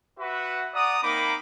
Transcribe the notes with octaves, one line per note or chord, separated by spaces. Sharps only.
F#4 B4 E5 F#5
D5 F#5 A#5 D#6
A#3 C4 D#4 B5 D6